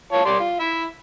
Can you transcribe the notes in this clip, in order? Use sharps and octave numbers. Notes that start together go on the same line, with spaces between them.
F4 C#5 A5
G3 D5 C6
F4
E4 E5